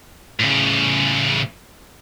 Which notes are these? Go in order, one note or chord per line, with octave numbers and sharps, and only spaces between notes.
A2 C#3